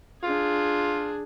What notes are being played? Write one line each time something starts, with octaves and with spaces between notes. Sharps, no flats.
D4 F4 G#4